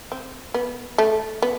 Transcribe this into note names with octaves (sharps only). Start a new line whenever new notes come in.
C4
B3
A3
B3